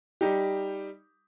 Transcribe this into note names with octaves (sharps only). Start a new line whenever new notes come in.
G3 D#4 G4